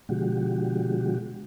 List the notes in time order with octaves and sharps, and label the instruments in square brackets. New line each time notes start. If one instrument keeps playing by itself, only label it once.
[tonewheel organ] B2 D3 F3 G#3 F#4 G4